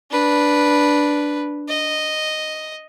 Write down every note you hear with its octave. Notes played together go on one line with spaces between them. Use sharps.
D4 B4
D#5